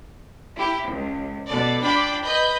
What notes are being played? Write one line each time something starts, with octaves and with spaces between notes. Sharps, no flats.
E4 G4
C#2
B2 A4 D5
D4 F4 D5 G5 B5 D6
B4 D#5 B5 G6